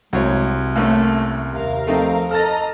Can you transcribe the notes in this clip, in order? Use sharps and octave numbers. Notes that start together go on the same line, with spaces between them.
C2 F#3 G#3 C#5
A1 A3 A#3 C#4
D#2 C3 A#4 F5
F3 A3 C4 D#4
A4 D#5 A#5 F6 A6